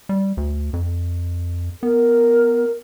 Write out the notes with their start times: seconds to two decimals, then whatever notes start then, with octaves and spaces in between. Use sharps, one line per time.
0.09 G3
0.37 D2
0.73 F2
1.83 B3 A#4